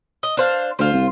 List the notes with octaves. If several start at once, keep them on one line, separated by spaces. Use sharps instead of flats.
D#5
D4 C5 F5
D2 F4 C5
C2